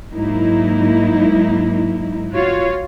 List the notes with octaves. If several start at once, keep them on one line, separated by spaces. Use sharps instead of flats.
G#2 F#3 A#3 D#4 E4
F4 F#4 C#5 F5